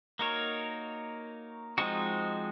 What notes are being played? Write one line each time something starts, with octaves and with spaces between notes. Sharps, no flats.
A#3 D#4 F#4 A#4 C#5
F3 G#3 C4 D#4 F#4